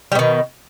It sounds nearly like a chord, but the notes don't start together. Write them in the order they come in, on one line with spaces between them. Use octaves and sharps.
G3 B2 D#3